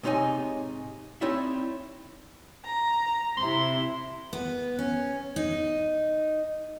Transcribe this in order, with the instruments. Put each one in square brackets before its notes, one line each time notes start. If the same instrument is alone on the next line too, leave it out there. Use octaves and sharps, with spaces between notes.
[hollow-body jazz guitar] G#2 C3 D#4 C#5 D#5 G#5
C4 D#4 E4 C#5 D5 E5
[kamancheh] A#5
[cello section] C3 E4 [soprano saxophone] C6
[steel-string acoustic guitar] B3
C#4
D#4